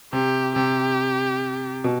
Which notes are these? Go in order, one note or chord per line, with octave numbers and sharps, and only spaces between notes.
C3 G4
C3 G4
B2